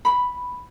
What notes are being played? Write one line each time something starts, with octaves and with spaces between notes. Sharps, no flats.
B5